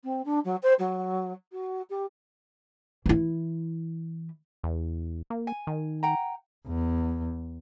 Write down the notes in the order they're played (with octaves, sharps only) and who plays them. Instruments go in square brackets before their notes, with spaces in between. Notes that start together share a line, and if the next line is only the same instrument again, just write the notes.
[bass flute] C4
D4
F#3
C5
F#3
F#4
G4
[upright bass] E3 E4
[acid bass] E2
A#3
[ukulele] G#5
[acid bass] D#3
[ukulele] F#5 G5 A#5
[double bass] E2